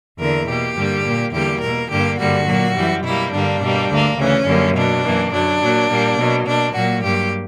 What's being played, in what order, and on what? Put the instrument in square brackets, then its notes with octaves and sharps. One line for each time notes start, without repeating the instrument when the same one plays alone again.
[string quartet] E2 D3 A#3 A#4
B2 A#3 G4
G2 D3 G3 A#3
A#2 A#3
E2 D3 G3 A#3 G4
B2 A#3 A#4
G2 D3 A#3 G4
G2 D3 G3 A#3 F#4
A#2 F#3 A#3
F#2 E3 G3
B2 G3 A#3 E4
G2 D3 G3 A#3 D4
B2 G3 A#3
D2 D3 A#3
D2 C#3 E3 C#4
F#2 D3 G3 A#3
B2 F#3 A#3 D4
F#2 E3 A#3
F#2 D3 F#3 D4
A#2 F#3 A#3
A#2 G3 A#3
B2 F#3 A#3
B2 A#3 D4
A#2 F#3 A#3 F#4
G2 F#3 A#3 G4